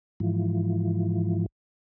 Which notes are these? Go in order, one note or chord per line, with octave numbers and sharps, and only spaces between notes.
G#2 E3 F3